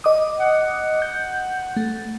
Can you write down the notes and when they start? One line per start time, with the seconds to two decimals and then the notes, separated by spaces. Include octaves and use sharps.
0.04 D#5 D6 D#6
0.39 F#5
1.02 G6
1.77 A3